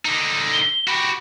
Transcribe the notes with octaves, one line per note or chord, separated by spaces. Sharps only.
D3 D#4
G7
F#4 G4 B5